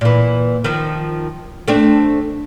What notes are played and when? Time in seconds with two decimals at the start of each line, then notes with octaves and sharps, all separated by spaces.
0.01 A#2 E3
0.64 D#3 F3
1.68 A3 C4 D4